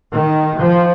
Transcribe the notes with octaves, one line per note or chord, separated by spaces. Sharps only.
D#3
F3